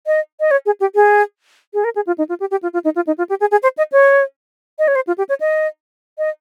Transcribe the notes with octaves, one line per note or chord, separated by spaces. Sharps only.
D#5
D#5
C#5
G#4
G4
G#4
G#4
A#4
G#4
F4
D#4
F4
G4
G4
F4
F4
D#4
F4
D#4
F4
G4
G#4
G#4
C5
D#5
C#5
D#5
C#5
C5
F4
G4
C#5
D#5
D#5